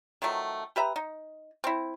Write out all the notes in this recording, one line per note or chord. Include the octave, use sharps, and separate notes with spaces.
D#3 F3 F#3 A3
G4 B4 E5 A#5
D#4
C4 E4